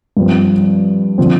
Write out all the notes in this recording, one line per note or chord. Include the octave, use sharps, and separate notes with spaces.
G2 F3 C4
D3 F3 C4